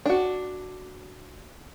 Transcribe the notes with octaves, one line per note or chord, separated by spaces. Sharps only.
D4 F#4